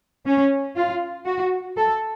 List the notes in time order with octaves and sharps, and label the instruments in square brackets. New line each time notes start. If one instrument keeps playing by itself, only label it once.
[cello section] C#4
F4
F#4
A4